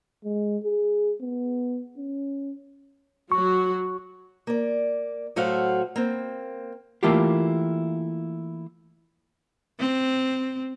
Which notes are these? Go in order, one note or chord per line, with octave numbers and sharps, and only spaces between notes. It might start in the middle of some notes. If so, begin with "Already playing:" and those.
G#3
G#4
B3
C#4
F#3 F#4 C#6
A#3 D5
A2 F#3 A3 F#4 C5 F5
A#3 C4
E3 A3 A#3 E4 F4 G4
C4